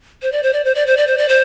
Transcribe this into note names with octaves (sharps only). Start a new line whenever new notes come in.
C5
D5
C5
D5
C5
D5
C5
D5
C5
D5
C5